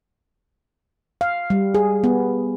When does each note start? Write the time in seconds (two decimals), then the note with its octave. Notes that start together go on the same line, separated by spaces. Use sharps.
1.21 F5
1.50 G3
1.75 G#4
2.04 B3